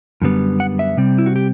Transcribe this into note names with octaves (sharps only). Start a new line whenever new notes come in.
F#2 D3 G3 B3
F#5
E5
C3 G3 C4
E4
F#4
G4